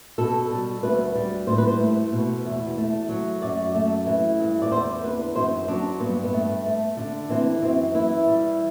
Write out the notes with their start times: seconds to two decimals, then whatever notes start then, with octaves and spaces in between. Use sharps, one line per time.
0.18 B2 A4
0.50 G3
0.83 D2 B4
1.15 G3
1.47 A2 C5
1.58 B4
1.68 C5
1.80 A3
2.12 B2
2.45 E2
2.78 A3
3.09 F#3
3.42 F#2 D5
3.75 A3
4.06 E3
4.39 G2
4.62 D5
4.71 E2 C5
5.04 D3 B4
5.36 F#2 C5
5.68 F#3 D4
6.00 G2 B3
6.24 B3
6.33 A3
6.65 A3
6.97 D3
7.30 E3 C4
7.63 F#2 C4
7.94 E3 E4
8.27 G3